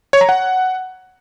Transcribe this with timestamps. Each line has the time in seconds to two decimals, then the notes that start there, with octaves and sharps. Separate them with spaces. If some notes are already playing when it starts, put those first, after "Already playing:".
0.13 C#5
0.21 A#5
0.29 F#5